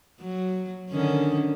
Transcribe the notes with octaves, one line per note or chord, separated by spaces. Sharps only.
F#3
D3 D#3 C#4